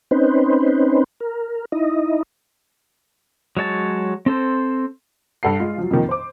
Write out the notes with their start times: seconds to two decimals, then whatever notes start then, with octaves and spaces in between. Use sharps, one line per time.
0.11 C4 C#4 D#4 B4 C5
1.20 A#4
1.72 D#4 E4 D#5
3.57 F#3 G#3 C#5 A5
4.26 C4 A4 C5
5.43 G2 A4 F#5 C7
5.60 G#3 F4
5.78 F3 F#3
5.91 F2 A#2 D#3 F3
6.09 C5 D6